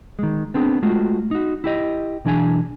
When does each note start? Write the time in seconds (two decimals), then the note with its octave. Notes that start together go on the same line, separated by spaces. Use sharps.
0.19 D#3 G#3
0.54 B3 C4 D4 G#4
0.82 G#3 A3 F4 F#4
1.31 D#4 F#4
1.64 E4 G4 D#5
2.25 B1 E3 D4 G#4 G#5